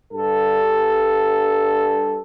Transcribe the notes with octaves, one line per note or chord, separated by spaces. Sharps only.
G2 A4